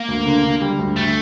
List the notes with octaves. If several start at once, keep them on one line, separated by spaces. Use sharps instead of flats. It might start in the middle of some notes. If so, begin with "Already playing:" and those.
Already playing: A#3
D2
D3
D3
G3
D2
D3 A3